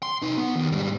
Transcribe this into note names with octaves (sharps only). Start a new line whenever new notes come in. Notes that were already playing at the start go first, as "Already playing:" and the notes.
C6
D#4 B4
B3
D#2
G#2 G3